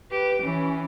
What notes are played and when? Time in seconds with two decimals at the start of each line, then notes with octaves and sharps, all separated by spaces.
0.11 G4 B4
0.42 E3 C#4